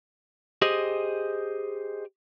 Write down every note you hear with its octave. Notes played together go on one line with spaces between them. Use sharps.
G4 G#4 C5 D#5